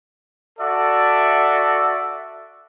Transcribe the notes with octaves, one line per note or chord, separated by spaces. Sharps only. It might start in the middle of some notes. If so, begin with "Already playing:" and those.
F#4 A4 D5 E5